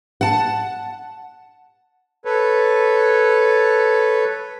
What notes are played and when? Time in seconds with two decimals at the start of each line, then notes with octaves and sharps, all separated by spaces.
0.21 F#5 A5
2.25 A4 B4 C#5